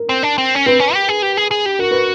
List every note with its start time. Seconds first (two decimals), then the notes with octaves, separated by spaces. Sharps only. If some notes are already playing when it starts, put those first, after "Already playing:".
Already playing: A#4
0.09 C4
0.23 D4
0.38 C4
0.55 C#4
0.66 C4 B4
0.80 C#4
0.94 G4
1.09 G#4
1.22 G4
1.37 G#4
1.51 G#4
1.66 G4
1.79 F#4 A#4
1.91 B4